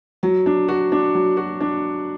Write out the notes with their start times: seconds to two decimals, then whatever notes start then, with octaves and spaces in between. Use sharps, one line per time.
0.23 F#3
0.46 D4
0.68 F#4
0.92 D4
1.15 F#3
1.37 F#4
1.60 D4